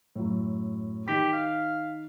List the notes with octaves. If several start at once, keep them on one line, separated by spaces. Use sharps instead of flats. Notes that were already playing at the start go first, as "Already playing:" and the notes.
F#2 A2
D#3 G4 B6
F5